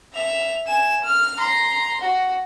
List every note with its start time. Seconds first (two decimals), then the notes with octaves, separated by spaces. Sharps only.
0.13 E5 F7
0.66 G#5 E7
1.04 F6
1.38 A#5 C6
2.01 F#4